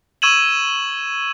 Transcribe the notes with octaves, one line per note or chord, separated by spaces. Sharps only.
C#6 E6 G#6 D#7 E7 F#7